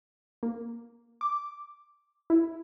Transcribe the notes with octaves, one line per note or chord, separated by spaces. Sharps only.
A#3
D6
E4